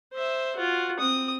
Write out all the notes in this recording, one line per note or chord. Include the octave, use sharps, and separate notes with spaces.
C5 E5
F4 F#4
C4 D#6